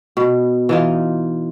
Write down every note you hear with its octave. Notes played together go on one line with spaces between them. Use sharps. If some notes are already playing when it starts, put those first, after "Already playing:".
B2
E3 D#4 F4